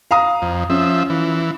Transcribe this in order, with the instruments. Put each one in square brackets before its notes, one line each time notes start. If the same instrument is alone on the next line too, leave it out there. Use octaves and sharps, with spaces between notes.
[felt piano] F5 A#5 D#6
[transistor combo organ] F2
[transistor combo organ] F3 E5 [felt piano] C#4
[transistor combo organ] E3